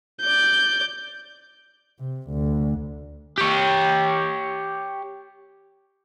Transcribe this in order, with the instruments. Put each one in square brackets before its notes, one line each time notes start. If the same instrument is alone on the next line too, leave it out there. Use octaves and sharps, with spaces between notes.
[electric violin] D5 G6
[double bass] C3
D2
[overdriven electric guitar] G4 C#5